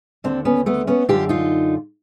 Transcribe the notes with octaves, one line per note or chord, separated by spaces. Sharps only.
D#2 D3 C4 D4
B3 C#4
A3 B3
B3 C#4
F#2 D3 F4 G4
D#4 F4